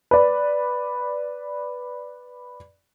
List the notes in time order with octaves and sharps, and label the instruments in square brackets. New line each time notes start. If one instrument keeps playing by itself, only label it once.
[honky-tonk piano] B4 D5